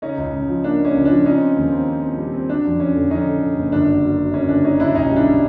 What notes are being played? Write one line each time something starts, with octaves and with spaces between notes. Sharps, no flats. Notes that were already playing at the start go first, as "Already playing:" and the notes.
C#3 C#4 D#4
C#2
C#2
F3
A#3 D4
A#3
C#4
C#2
F3 D4
C4 C#4 D#4
C4
D#2
C4
C4
C4
G3
C4
F#3 D4
F2
F2 C#4
D3
F2 C#4 D#4
D3
D3
F#1
G1 D4
F#3
F#3
F#3
F#2 C#4
G1 D4
F#3 C#4 D#4
G1 D4 E4
B1 C#4 D#4
G3
D4 E4
G3